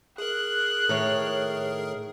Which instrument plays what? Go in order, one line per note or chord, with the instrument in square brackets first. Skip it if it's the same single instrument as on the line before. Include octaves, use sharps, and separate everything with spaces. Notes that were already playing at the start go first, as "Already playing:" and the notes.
[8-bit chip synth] G#4 A#4 [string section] F#6
[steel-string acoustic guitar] A2 D#3 C#5